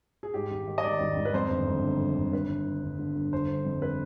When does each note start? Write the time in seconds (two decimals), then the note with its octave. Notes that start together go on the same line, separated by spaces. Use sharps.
0.23 G#4
0.34 G#2 G4
0.51 G#1
0.67 D#3
0.78 D#5
0.83 D#3 D5
1.00 G#1
1.16 G#1
1.25 B4
1.33 F2 C5
1.50 G1
1.67 G1
1.84 D3
1.99 G1
2.17 G1
2.33 G1 B4
2.49 D3
2.65 D3
2.83 G1
2.99 D3
3.15 G1
3.32 G1 C5
3.49 D3
3.65 F2
3.82 B4